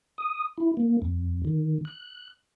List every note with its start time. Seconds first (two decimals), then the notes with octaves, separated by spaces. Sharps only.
0.18 D#6
0.58 E4
0.77 A#3
1.02 F2
1.45 D#3
1.85 F#6